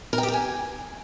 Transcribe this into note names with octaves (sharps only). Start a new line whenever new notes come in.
A#4
G5
G4
G5
G#5